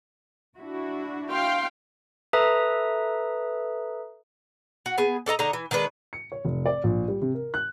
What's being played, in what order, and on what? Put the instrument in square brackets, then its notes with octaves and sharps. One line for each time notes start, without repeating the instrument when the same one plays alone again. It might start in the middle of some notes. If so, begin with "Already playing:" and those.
[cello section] D4 E4 F#4
[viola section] F5 G5 [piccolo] C6
[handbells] A4 B4 E5 A#5 D#6
[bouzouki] F#4
B3 G#4
D4 A4 D#5 A#5
D3 D#4 D#5 A#5
E3
D#3 G#3 D4 B4
[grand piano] C#7
C#5
F1
D5
A#1
G3
C3
A#4
F#6